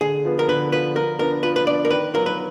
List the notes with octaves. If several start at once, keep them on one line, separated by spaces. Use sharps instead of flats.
D3 G#4
F3 B3
A#4
D3 B4
F3 B3 B4
F3 A#4
B3 D4 F4 A#4
F3 B4
B4
B3 D4 F4 D5
A#4
D#3 B4
F#3 B3 F4 A#4
B4